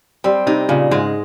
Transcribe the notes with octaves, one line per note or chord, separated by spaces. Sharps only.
G3 C4
C3 D#4
A#2 C#3
G#2 G#3